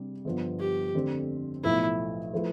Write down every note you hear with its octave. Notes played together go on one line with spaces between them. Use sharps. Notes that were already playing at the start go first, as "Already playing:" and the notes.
Already playing: C3 G3 D4
G1 G2 F3 B3
G4
F2 D3 A3 C4
B1 A2 F3 A3 E4
F3 A3 E4 B4